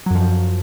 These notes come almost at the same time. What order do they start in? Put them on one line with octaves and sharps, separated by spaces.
F#3 F#2 F3